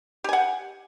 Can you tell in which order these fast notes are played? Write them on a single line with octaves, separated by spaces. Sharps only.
G4 G#5 F#5